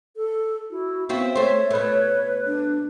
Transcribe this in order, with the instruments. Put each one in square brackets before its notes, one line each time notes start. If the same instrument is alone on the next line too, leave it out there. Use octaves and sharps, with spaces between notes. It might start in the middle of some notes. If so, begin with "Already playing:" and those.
[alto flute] A4
[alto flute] E4 [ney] F#4
[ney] B3 [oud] C4 F4 F#4 [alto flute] E5
[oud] A3 C5 [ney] C#5 [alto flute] E5
[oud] B2 A3 [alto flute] B4
[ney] D4